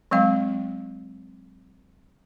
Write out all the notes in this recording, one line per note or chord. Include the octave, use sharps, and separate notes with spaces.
F#3 G#3 C4 F5